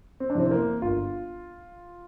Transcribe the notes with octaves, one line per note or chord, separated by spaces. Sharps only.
C4
D4
F2 C3 E3 C4
C4
A#3
G1 F4